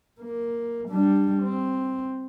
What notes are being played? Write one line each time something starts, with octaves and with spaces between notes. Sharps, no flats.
A#3
G3 D4
C4